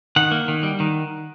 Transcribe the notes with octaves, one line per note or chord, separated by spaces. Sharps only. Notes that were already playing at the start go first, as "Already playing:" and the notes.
D#3 F#5
A#3
D#3
G3
D#3